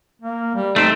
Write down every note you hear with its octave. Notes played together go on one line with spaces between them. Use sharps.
A#3
G3
A3 C4 D#4